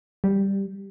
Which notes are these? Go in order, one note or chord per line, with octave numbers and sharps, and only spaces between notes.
G3